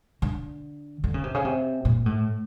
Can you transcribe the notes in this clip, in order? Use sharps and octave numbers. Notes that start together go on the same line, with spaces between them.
D3
D3
C#3
C3
C#3
C3
A#2
A2